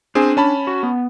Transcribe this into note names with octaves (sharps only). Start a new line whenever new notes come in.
C4 D4 G#4 G#5
C#4 A5 B5
F#4
B3